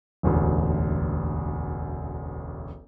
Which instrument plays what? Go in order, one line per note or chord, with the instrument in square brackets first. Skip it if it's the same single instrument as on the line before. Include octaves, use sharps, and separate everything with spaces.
[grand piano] E1 A1 D2